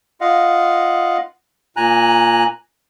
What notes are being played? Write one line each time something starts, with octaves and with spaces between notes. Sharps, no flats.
F4 D#5 F5 F#5
A#2 G#5 A#5 F#6